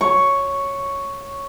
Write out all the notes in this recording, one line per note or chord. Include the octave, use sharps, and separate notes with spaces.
C#5 C#6